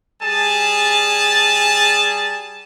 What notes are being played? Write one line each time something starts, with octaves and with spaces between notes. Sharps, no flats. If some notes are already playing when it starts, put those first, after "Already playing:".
G3 G#4 G#5 A5